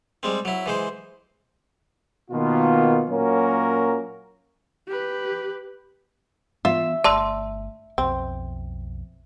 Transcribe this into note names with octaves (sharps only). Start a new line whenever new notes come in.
G3 G#3 C4
F#3 E4
E3 G#3 C5
B2 D#3 A#3 B3 F4
A#2 F#3 A#3 C#4 F#4 A#4
G4 B4
E3 B3 F4 E5
G1 A3 D5 A5 C6 E6
B1 F2 C4